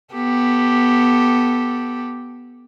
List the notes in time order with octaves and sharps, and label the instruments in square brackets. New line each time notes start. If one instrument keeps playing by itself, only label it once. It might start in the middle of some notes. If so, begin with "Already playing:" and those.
[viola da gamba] B3 G4 A4